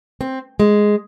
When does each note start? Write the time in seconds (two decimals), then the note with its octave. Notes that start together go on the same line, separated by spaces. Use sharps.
0.21 C4
0.60 G#3